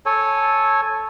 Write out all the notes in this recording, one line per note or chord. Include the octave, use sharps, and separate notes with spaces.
A4 C#5 G#5